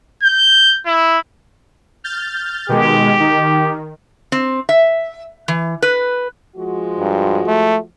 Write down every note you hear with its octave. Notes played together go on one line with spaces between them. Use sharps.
G6
E4
F6 G6 A6
B2 D#3 G#3 G4
D#3
C4
E5
E3
B4
F3 G#3 F#4
G2
A3